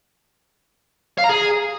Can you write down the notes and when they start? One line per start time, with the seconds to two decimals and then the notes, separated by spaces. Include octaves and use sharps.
1.18 F5
1.24 A#5
1.29 G#4